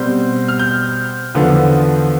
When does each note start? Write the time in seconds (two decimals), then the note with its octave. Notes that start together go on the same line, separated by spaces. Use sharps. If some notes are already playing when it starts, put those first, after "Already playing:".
Already playing: B2 G3 C4 G6
0.48 F6
0.59 G6
1.35 E2 D3 F3 B3